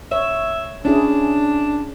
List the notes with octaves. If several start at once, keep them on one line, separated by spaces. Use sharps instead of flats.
C#5 E5
C#4 D4 E4 G#4